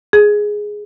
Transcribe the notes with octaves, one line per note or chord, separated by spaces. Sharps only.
G#4